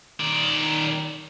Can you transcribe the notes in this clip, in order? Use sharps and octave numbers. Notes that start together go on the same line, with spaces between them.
D#3 D5